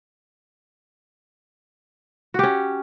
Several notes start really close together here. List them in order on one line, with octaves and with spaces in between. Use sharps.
F#4 G4 C#4